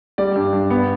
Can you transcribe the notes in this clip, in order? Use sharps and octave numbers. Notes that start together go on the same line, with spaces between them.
G3 D5
G2
G2
B3